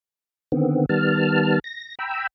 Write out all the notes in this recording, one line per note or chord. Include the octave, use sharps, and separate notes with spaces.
D3 D#3 B3 C4
D#3 G3 B3 A5 F6
A#6
G5 A#5 B5 E6